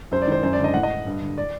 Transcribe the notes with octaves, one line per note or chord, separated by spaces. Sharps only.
F#2 C5
D5
D#3 C5
F#2 C5
D5
D3
D#5
A2 F#5
D#5
G2
D3
D5